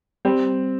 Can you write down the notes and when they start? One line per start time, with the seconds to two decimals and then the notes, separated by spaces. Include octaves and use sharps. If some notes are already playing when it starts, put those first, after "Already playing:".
0.25 G3 C4